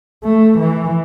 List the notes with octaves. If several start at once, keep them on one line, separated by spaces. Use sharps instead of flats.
A3
E3